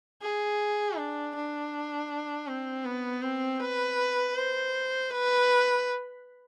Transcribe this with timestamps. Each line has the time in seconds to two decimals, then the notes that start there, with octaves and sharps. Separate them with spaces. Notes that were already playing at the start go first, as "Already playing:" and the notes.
0.22 G#4
0.97 D4
1.35 D4
2.47 C4
2.85 B3
3.22 C4
3.60 B4
4.35 C5
5.10 B4